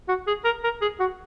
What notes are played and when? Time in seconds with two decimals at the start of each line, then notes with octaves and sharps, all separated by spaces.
0.08 F#4
0.27 G#4
0.45 A#4
0.64 A#4
0.81 G#4
1.00 F#4